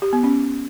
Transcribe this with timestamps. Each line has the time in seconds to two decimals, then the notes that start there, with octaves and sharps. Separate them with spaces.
0.02 G4
0.13 B3
0.23 C#4